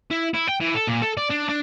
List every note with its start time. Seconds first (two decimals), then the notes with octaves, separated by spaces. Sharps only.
0.11 E4
0.34 E4
0.48 G5
0.60 E3
0.74 A4
0.87 A#2
1.02 A4
1.17 D5
1.30 D4
1.49 D4